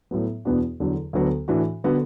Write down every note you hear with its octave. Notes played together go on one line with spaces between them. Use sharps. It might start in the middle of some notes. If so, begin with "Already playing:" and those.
A2 F#3 B3
E2 B2 B3 D4 F#4
E2 D3 F#3
D2 D3 F#3 B3 F#4
A2 E3 D4 F#4
D3 B3 F#4